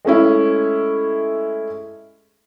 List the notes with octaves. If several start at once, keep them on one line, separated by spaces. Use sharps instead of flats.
G#3 A3 C#4 E4